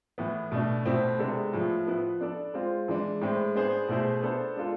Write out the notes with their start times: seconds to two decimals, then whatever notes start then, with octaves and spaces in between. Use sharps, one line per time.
0.18 A2 E3 B3
0.52 B2 A3 D4
0.85 B2 A3 C4 E4
1.19 C3 G#3 B3 D4 A4
1.53 A2 F3 A3
1.87 F3 B3 E4 B4
2.21 B3 D4 A4 D5
2.54 G#3 C4 F4
2.88 E3 G#3 D4
3.21 A2 G#3 C4
3.55 B3 D4 G#4 C5
3.88 B2 A3 E4 G#4 C5
4.23 B3 D4 A4 C5
4.56 G#3 D4 F4 A4